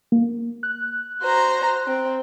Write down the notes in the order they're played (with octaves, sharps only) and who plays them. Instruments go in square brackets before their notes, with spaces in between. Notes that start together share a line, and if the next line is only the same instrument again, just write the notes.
[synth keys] A#3
F#6
[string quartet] F#4 C5 A#5
C4